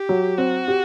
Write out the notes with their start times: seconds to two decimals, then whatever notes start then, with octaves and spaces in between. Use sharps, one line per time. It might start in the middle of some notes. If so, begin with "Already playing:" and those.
Already playing: G4
0.09 F#3
0.38 C4 F#4
0.68 G4